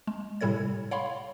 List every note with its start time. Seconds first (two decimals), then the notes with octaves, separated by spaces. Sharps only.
0.07 G#3
0.41 A2 C3 G3 A4 C#5 G#6
0.91 C#5 F5 F#5 B5 C6